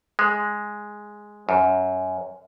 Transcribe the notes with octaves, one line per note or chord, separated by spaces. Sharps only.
G#3
F#2